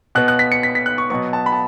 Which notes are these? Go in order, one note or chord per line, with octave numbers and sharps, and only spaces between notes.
B2 B3 F#6
F#6
B6
C#7
B6
B6
F#6
C#6
B2 F#3 B3 C#6
A5
B5
A5